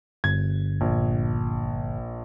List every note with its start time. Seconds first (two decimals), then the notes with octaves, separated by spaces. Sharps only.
0.24 G1 G#6
0.81 A#1